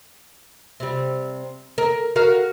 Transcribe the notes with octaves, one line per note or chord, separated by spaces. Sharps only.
C3 G3
A#4
F#4 A#4 F5